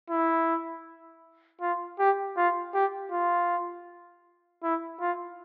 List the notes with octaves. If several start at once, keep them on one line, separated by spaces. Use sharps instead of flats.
E4
F4
G4
F4
G4
F4
E4
F4